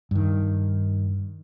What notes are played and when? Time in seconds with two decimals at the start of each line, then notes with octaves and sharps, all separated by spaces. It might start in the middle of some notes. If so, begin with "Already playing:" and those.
0.11 G2 D#3